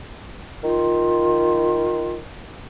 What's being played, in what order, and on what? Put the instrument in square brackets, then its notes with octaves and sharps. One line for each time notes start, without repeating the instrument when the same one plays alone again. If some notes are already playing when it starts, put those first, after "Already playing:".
[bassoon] D#3 [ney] F4